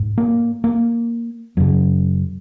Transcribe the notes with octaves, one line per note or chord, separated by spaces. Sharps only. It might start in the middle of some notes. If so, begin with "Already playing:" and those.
Already playing: G#2
A#3
A#3
F#2 C#3 F#3